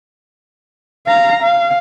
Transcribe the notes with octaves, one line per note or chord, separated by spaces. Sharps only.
F5 A#5
F5